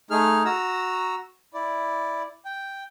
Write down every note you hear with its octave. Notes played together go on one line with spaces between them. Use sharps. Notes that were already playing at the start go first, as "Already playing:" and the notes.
A3 D#4 G#4 F6
F#4 A#5 E6
E4 D5
G5